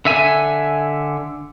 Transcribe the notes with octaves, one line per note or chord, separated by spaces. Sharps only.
D3 E5 G#5